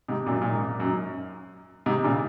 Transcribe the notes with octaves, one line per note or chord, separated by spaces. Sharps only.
G#2 C3
F#2 A#2
A#2
G#2
F#2
G#2 C3
A#2 C#3